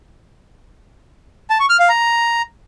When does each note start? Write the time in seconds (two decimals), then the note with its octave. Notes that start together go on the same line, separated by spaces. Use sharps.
1.50 A5
1.60 C#6
1.70 F6
1.79 F5
1.89 A#5